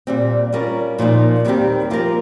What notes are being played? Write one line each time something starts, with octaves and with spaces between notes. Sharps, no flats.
A#2 G3 C4
G3 C#4 F4 A#4
A#2 F3 A#3 D#4
D#2 D#3 G3 C4 G4
F3 A#3 F4 A#4